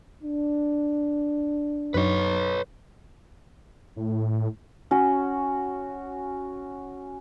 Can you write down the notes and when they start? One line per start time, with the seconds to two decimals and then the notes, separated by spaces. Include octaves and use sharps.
0.23 D4
1.94 F#2 F#3 D#4 B4 C#5
3.96 A2
4.91 C#4 F#4